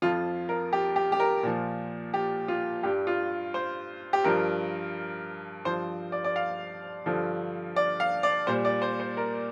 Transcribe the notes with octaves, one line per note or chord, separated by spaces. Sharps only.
F2 F3 F4
A#4
G4
G4
G4
A#4
A#2 F3
G4
F4
G2 G3 G4
F4
C5
G4
G2 F3 A#4
G2 F3 C5
D5
D5
F5
G2 D3 F3
D5
F5
D5
A#2 G3 C5
D5
C5
C5
A#4